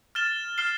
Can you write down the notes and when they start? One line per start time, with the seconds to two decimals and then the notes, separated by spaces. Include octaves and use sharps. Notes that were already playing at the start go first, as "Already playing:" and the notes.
0.15 F6 A6 E7 G7
0.58 F6 C7 E7 G7